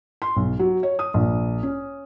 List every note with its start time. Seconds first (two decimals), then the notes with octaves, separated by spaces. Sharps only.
0.22 C6
0.36 B1
0.59 F#3
0.83 C#5
0.99 D#6
1.14 A#1
1.63 C#4